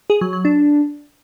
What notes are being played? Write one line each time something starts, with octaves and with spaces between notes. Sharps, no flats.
G#4
F#3
F#3
D4